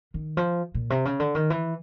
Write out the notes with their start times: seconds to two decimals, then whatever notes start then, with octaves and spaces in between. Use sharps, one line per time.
0.14 D#3
0.37 F3
0.74 A#2
0.90 C3
1.05 C#3
1.20 D3
1.35 D#3
1.50 E3